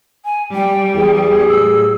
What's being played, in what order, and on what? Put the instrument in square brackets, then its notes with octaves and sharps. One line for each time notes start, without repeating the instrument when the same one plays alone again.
[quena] G#5
[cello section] G3 [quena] G5
[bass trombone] E2 [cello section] G3 [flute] G#4
[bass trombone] A2 [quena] E6